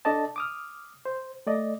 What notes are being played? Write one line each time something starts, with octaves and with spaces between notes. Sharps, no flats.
D4 A4 D5 D#5 A5
D6 D#6 F6
C5
A3 D5 D#5